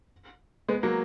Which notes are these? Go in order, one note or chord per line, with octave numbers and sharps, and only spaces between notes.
G#3 B3
F#3 A#3